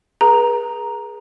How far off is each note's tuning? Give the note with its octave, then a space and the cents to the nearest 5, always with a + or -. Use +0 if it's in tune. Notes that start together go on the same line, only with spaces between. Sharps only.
G#4 +0 B4 -40 A#5 +0